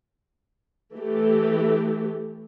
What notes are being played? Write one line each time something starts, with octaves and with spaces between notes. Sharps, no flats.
E3 A3 G4